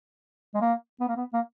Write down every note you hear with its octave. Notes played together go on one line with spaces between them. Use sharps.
G#3
A#3
B3
A#3
B3
A#3